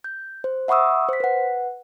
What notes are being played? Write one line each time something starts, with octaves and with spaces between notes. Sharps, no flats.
G6
C5
E5 F#5 B5 C#6 D#6 E6
C5 B6
B4 F#5